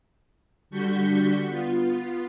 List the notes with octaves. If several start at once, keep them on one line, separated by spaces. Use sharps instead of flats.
D3 G3 F#4 C#6 G6 B6
B3 F4